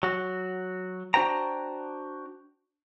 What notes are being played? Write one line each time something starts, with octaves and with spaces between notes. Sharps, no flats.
F#3 F#4
D4 F#4 C5 G5 A#5